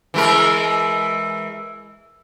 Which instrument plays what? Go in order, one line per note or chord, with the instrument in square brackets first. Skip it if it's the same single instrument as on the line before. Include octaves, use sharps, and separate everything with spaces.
[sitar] E3 G#3 A#4